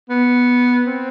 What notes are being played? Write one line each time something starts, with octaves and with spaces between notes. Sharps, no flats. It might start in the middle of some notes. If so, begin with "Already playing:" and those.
B3
C4